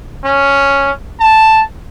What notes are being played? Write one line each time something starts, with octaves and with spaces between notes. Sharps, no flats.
C#4
A5